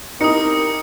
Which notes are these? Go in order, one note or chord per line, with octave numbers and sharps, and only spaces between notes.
C4 D#4 E4 G4 A#4 D#6 C#7